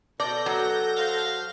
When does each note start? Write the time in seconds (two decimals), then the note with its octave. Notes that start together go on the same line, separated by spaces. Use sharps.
0.20 B2 A4 D5 G6 A#6
0.46 F#3
0.97 C5 F5